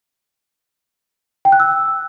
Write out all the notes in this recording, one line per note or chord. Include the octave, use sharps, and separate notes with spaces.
G5
F#6
E6